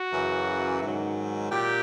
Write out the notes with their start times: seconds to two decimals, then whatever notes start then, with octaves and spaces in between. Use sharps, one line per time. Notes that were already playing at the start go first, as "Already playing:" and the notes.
Already playing: F#4
0.13 F#2 C#3 E3
0.82 G#2 D#3 F#3
1.51 A#2 G4